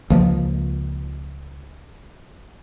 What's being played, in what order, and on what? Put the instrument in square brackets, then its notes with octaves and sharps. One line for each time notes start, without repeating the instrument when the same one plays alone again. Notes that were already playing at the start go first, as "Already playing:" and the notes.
[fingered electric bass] C#2 F3 A#3